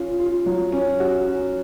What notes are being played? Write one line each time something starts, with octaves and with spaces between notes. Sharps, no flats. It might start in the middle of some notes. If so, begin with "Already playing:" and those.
Already playing: C#4 F4
F4
F#3
C#4
F#4
C#4